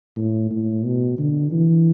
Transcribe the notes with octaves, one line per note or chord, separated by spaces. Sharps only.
A2
A2
B2
D3
E3